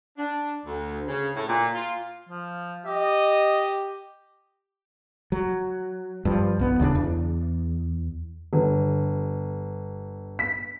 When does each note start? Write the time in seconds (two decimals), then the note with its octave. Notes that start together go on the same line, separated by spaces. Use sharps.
0.17 D4
0.66 D2
1.07 C#3
1.35 A2
1.47 A#2
1.74 F4
2.29 F3
2.86 G4 D#5
5.32 F#3
6.25 G2 F3
6.59 B1 B3
6.79 D1 C#3 C4 D4
6.95 E2
8.53 G1
10.39 B6